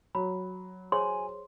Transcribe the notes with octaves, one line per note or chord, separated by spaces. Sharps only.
F#3 B5
G#4 C5 C#5 G#5 C6